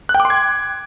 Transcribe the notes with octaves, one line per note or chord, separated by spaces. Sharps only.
F#6
G5
D6
C6
G#6